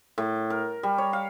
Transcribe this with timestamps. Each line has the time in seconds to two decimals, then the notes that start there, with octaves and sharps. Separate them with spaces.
0.18 A2
0.50 A#4
0.83 G3
0.98 C#5
1.13 F5